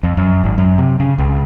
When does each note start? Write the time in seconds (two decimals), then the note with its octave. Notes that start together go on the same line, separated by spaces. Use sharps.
0.03 F2
0.17 F#2
0.44 G#1
0.58 F#2
0.78 C3
1.00 C#3
1.18 C#2